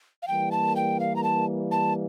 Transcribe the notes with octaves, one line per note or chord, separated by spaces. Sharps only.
F5
E3 G3 A#3 G5
A5
G5
F5
A#5
A5
A5